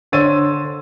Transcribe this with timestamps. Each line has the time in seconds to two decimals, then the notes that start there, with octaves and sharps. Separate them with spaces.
0.12 D3 C5 C#5 E6 A6 D#7